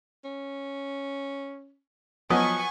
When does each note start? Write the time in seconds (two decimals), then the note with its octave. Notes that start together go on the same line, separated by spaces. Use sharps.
0.25 C#4
2.30 F3 F#3 B3 D#5 G#5 C#6